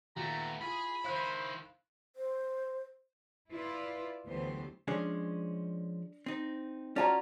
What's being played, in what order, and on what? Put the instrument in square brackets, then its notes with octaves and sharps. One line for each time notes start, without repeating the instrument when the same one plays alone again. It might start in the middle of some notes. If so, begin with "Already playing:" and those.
[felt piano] D#2 A#2 [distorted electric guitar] A3 B3 [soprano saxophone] A#5
[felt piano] E4 F4 [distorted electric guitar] G#4 [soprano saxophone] B5
[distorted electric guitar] D#3 E4 [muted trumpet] C5 [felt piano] F5 F#6
[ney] C5
[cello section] E4 F4 B4 D5
D2 E3 F#3 B3 G4 C5
[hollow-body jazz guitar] F3 G#3 C#4 [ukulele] D4
[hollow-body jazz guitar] C4 D#4
[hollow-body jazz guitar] C#4 F4 F#4 [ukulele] D5 A5 A#5